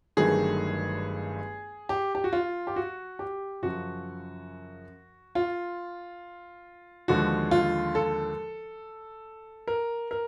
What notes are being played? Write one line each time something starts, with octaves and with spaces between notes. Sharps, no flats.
G1 G2 D#3 F#3 A3 G#4
G4
G4
F#4
F4
G4
F#4
G4
F#2 C#3 F3 F#4
F4
D#2 D3 F3 G#3 F#4
F4
A4
A#4
A#4